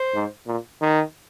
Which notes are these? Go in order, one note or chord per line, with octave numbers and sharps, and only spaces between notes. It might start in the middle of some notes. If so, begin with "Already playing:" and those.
Already playing: C5
G#2
A#2
D#3